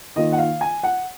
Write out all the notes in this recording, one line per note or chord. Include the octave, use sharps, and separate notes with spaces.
D#3 A#3 F4 D#5
F#5
F5
G#5
F#5